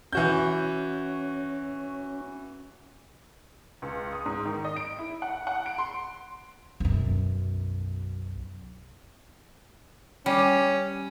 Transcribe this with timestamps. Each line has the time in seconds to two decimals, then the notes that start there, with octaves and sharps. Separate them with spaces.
0.13 E3 C#4 F#4 G6
3.82 C#2
4.13 D#6
4.26 G#2
4.45 D#3
4.65 D#5
4.76 D7
4.99 E4
5.22 F#5
5.47 F#5
5.66 D7
5.78 C6
6.80 B1 F#2
10.26 G3 C#4